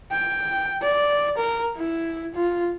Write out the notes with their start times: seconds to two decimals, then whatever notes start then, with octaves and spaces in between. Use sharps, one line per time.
0.12 G5
0.82 D5
1.38 A#4
1.77 E4
2.35 F4